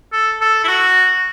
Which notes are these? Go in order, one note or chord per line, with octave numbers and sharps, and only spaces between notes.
A4
A4
E4
F#4